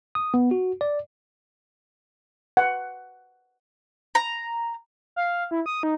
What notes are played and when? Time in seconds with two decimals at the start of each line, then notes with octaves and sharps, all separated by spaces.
0.15 D#6
0.34 B3
0.51 F#4
0.81 D5
2.57 F#5
4.15 A#5
5.16 F5
5.51 E4
5.66 D#6
5.83 D#4